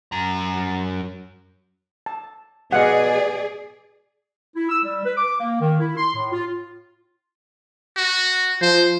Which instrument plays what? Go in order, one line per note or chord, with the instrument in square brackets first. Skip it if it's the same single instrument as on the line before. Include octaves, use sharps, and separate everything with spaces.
[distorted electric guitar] F#2 A#5
[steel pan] A5
[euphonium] B2 [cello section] G#4 D5 [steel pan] D#5 F5 F#5
[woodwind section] E4
E6
G3
B4
D6
A#3
D#3
E4
C6
A2
F4
[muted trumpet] F#4
[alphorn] F3 [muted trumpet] C5